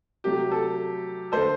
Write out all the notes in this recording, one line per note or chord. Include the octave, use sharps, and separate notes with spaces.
C3 F#3 A3 G4
A4
D3 A3 A4 C5